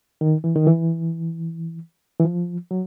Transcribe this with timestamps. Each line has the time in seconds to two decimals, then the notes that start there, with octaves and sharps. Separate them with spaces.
0.21 D#3
0.44 E3
0.56 D#3
0.67 E3
2.20 E3
2.25 F3
2.71 F#3